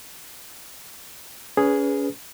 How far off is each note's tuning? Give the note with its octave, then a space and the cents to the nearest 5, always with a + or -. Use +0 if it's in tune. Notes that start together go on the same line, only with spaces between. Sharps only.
C#4 +30 G#4 +0 B4 +0